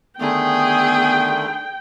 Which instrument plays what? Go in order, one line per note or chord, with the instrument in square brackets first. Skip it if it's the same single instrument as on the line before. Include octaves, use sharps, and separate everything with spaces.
[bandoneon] D3 D#3 A3 [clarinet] B3 [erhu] G#4 [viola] G5